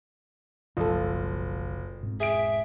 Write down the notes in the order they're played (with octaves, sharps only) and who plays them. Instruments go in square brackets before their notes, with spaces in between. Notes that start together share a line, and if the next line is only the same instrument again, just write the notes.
[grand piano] F#1 [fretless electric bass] B1 F3 G3 [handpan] F4 A4
[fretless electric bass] E1 G#2 C4
[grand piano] G#4 D7 [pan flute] E5